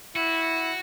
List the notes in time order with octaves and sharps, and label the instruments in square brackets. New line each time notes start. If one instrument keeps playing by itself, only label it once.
[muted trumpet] E4 [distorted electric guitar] F#4